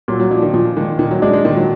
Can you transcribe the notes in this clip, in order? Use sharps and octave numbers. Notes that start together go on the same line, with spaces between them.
A#2 F#3
F#3
F3 D4
D#3
A#2 F3
D#3 G#3
A#2 D#3
F#3
G#3 D4
G#3
A#2 D#3
F#3